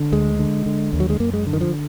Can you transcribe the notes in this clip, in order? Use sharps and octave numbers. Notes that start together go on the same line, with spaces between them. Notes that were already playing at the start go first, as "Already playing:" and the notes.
Already playing: D3
D2 G#3
D3
D3
D#2
F#3
G#3
F#2 A#3
G#3
D3
D#3
F3